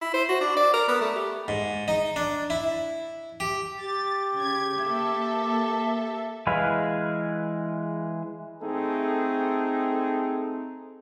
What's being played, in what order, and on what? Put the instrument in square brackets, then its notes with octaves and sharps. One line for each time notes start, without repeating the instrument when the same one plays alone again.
[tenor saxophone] E4
C5
F#4
D4
D5
A#4
B3
A3
G4
[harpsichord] G#2
D#4
D4
E4
G4
[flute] G4 [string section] A6
[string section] C#3 G#6
A#3 A4 E5
[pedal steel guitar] E3 G#3 G#4 B4 F5
[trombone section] A3 C4 D#4 G#4 A4